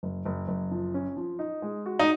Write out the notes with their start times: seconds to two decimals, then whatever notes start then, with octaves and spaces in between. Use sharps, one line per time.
0.03 F#1
0.25 F#1
0.48 F#1
0.71 F3
0.94 C#4
1.17 F3
1.39 D#4
1.62 G#3
1.86 F#4
1.99 D#4